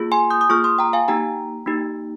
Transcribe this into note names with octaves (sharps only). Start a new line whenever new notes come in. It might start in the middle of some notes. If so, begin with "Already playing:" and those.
Already playing: A#3 F4 G#4
G#5 C6
D#6 G6
D#6
A#3 F4 G#4 C#6 F6
C6 D#6
G5 A#5
F5 G#5
A#3 D#4 G4 G5 A#5
A#3 D#4 G4